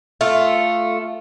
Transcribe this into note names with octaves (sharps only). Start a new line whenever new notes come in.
A3 F4